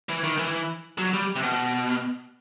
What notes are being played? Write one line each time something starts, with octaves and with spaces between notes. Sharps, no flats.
E3
D#3
E3
F#3
G3
C3
B2